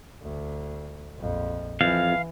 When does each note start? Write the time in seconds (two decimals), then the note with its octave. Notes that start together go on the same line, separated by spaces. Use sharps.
0.22 D2
1.18 A#1 F2
1.81 F2 E3 F5